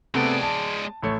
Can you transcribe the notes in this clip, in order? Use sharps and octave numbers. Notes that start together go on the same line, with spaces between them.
C3 G#3 A3 B3 D5
A5
A1 A3 C#5